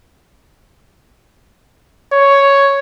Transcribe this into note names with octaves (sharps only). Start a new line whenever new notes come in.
C#5